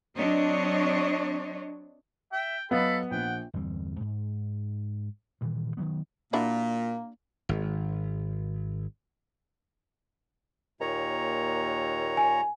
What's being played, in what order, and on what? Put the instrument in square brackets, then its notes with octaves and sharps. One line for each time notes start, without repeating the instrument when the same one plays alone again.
[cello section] F#3 C4 D4 C#5 D#5
[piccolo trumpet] E5 [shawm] G5
[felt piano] F#3 D#5 F5 [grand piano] B3 [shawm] A4 [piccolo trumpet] B5
[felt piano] A#1 [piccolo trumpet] F#5 [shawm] G5
[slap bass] G1 E2 G3 C4
G#2
G2 A#2 D#3 E3
D#3 E3 F#3 B3
[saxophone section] A#2 [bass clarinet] A#3 [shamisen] D4 E4 F#4
[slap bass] G#1
[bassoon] D#2 [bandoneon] A#2 C#5 A#5
[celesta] G#5